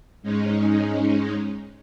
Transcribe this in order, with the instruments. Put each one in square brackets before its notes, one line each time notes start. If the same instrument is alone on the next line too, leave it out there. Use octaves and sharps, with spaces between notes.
[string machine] G#2 G#3 C#4 D#4